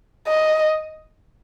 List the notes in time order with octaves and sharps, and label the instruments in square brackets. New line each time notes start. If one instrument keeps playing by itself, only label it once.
[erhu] D#5